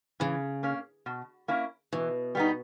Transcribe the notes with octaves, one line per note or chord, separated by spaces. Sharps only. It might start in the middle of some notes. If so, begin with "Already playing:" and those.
C#3 E3
A#3 C#4
B2
A#3 C#4 E4
B2 E3
G3 B3 D#4